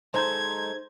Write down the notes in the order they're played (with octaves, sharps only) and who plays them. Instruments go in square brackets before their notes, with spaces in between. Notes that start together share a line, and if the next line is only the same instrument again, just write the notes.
[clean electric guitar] G#3 D#4 A4 [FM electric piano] C5 A#5 G6 [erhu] G#6